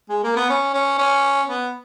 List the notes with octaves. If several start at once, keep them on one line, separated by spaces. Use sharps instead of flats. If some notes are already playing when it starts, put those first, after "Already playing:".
G#3
A#3
B3
C#4
C#4
C#4
B3